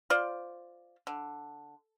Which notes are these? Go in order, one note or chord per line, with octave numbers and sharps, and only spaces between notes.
F4 C5 D5
D3